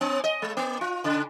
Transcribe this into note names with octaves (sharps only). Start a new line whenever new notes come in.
B3
D#5
G#3
A#3
F4
C#3